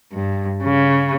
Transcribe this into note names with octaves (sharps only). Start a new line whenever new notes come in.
G2
C#3